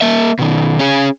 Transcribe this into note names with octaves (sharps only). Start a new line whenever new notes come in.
A#3 E5
B2 D#3
C#4 G#4